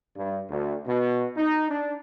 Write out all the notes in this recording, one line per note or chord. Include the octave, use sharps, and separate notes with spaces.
G2
D2
B2
D#4
D4